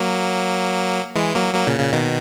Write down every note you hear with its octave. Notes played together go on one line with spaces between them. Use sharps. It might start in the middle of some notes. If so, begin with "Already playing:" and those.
Already playing: F#3 A#3
E3 G#3
F#3 A#3
F#3 A#3
A#2 C#3
A#2 C#3
B2 D#3